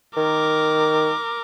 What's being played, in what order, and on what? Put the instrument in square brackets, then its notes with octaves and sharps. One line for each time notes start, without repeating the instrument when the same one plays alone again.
[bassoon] D#3 [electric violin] A#4 D6